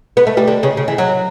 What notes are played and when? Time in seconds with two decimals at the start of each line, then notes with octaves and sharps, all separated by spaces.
0.17 B3
0.27 A3
0.37 G3
0.48 D3
0.63 C#3
0.77 C#3
0.88 E3
0.98 F#3